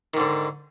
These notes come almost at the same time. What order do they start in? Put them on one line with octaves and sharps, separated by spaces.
D#3 G#2 D3